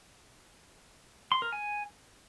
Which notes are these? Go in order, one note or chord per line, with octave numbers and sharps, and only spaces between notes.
C6
A#4
G#5